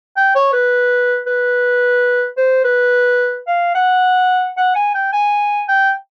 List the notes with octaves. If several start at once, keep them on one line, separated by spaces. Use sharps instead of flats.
G5
C#5
B4
B4
C5
B4
F5
F#5
F#5
G#5
G5
G#5
G5